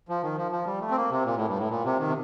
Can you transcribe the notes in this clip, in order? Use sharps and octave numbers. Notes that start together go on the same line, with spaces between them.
F3
D#3
F3
F3
G3
A3
C4
A#3
C3
A#2
A2
G2
A2
A#2
C3
D#3
C3